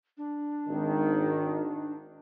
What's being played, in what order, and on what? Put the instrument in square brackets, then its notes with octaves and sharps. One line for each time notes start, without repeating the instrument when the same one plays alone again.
[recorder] D4
[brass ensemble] G#1 D#3